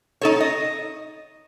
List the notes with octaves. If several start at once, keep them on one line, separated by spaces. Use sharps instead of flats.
D#4 A4 C#5
D#5